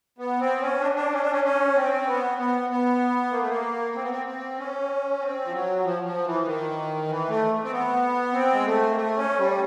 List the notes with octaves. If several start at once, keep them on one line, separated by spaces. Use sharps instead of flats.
B3
C4
C#4
D4
D4
C#4
D4
C#4
C#4
C4
B3
B3
B3
A#3
A3
A#3
C4
B3
C4
C4
C#4
C4
F3
F#3
F3
F3
E3
D#3
E3
A3
C4
B3
C4
G#3
A3
A#3
A3
C#4
G3